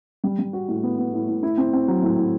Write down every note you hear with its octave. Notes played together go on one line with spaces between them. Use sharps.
G3
G3
F#4
A2
B3
B3
A2
A2
E4
C4
C4
F#3
A2
A2